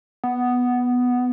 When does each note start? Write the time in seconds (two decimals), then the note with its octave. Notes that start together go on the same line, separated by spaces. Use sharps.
0.24 B3